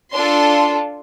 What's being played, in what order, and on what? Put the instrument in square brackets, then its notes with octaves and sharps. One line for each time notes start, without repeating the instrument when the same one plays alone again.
[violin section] D4 F4 A4 C6